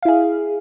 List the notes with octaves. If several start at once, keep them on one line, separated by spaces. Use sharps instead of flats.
E4 G#4 F5